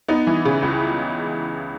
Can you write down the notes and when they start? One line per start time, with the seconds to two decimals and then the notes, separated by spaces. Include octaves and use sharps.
0.08 B3 D#4
0.27 E3
0.45 C#3
0.62 C#2